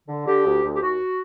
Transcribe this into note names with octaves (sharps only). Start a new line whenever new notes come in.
D3
D3 G4
D2
D2
G4
D#2 F#4